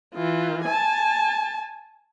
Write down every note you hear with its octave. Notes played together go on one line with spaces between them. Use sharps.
E3 F4
G#5 A5